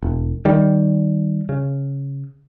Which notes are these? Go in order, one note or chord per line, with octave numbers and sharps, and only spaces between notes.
E1
D#3 G3
C#3